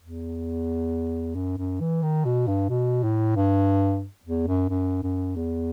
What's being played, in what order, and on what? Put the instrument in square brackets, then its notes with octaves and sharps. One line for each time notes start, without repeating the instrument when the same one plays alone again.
[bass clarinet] E2
F#2
F#2
E3
D#3
B2
G2
B2
A2
G2
E2
F#2
F#2
F#2
E2